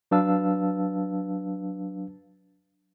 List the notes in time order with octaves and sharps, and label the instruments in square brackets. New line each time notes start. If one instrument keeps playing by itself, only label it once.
[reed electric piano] F#3 D4 B4 F5 A5 E6